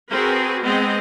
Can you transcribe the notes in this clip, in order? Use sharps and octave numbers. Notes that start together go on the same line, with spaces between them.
C4 F#4 G#4 A#4 B4
G#3 B3 C4 D#5